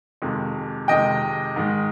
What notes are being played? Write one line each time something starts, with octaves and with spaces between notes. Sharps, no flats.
F2 C3 D#3 G#3
F2 C3 D#3 G#3 D#5 G5
G#2 D#3 G#3